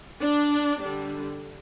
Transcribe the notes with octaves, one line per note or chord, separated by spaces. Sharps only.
D4
D3 G3 D4